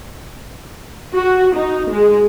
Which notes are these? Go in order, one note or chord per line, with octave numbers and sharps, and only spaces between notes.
F#4
D#4
G#3